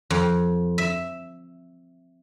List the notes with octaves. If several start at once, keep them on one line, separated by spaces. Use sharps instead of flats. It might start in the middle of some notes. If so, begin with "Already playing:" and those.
F2
E5